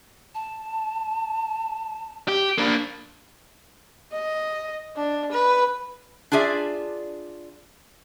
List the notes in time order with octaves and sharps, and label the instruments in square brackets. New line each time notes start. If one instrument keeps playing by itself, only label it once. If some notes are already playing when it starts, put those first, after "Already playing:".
[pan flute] A5
[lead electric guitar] G4
[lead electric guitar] A#3 D4 [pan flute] B5
[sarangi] D#5
D4
B4
[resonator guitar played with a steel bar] D4 F4 G#4 D5 E5